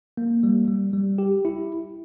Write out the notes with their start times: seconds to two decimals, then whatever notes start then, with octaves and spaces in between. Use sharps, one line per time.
0.17 A#3
0.43 G3
0.68 G3
0.93 G3
1.18 G4
1.45 E4